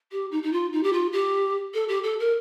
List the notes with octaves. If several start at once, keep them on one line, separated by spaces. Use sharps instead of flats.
G4
D#4
D#4
F4
D#4
G4
F4
G4
A4
G4
A4
A#4